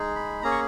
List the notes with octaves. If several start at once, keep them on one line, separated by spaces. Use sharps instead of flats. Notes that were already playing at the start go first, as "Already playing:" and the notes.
Already playing: G#3 D#4 G#4
B5
A#3 C#4 G#4 A#5
C#6